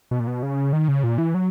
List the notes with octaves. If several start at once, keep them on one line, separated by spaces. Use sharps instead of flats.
B2
A#2
B2
C#3
D#3
C#3
A#2
E3
F#3